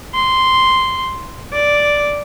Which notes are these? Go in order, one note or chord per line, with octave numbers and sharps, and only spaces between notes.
C6
D5